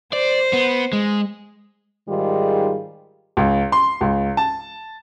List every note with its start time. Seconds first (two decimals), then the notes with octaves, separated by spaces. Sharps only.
0.13 C5 D5
0.53 B3
0.93 G#3
2.09 G#2 D#3 G3 F4 G#4
3.37 C#2
3.72 C6
4.01 C#2
4.37 A5